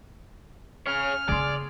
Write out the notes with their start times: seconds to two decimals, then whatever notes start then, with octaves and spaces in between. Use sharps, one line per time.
0.86 C#4 G#4 C#5 F6
1.29 C#3 A#3 G#4 D5 C6